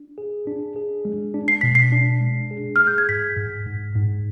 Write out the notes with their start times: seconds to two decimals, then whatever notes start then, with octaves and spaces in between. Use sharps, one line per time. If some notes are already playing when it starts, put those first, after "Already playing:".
Already playing: D4
0.18 G#4
0.47 D4
0.76 G#4
1.05 G#3
1.34 D4
1.48 C7
1.61 B2 B6
1.75 C7
1.92 D4
2.21 G#3
2.51 G#4
2.76 G#4 F6
2.87 G6
2.98 G#6
3.09 G#2 B6
3.37 G#2
3.66 G#2
3.95 G#2